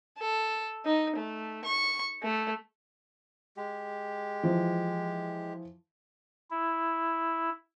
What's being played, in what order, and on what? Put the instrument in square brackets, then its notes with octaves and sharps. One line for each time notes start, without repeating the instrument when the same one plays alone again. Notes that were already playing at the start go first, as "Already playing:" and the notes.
[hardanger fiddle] A4
D#4
A3
C#6
A3
[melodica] G#3 G4
[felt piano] E3 F3
[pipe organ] E4